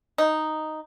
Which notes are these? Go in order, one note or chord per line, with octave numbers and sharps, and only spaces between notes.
D#4